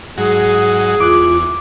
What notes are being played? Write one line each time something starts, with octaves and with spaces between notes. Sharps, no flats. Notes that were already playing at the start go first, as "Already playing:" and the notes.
G#2 F#3 G#4
E2 F4 D6 F#6